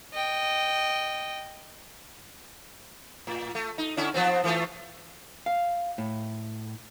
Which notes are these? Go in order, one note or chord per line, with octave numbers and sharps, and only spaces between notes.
D#5 G5
A2
A3
D#4
D3 C#4 E4
F3 B3 C4
E3 A3 F4
F5
A2